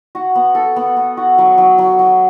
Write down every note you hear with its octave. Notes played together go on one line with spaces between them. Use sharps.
F#4
B3
A4
B3
B3
F#4
F#3
F#3
F#3
F#3